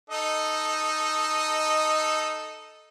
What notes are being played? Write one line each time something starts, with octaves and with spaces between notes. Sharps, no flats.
D#4 A4 D#5